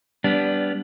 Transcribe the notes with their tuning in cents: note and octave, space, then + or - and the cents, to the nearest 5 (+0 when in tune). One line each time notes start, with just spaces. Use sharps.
G3 +0 B3 +0 D4 -20